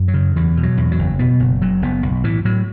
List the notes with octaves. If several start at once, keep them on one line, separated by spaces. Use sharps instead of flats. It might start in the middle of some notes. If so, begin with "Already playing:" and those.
Already playing: F#2
F#3
C#3
E2 E3
B2
F#3
E2
F#3
F#1
B2 B3
F#1
F#1 F#3
F#1 B3
B1
A2 E3
A2 F#3